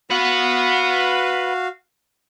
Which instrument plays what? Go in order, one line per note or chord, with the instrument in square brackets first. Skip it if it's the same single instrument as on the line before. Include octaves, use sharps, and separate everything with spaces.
[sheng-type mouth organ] F#4 F5 [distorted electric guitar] B4 F#5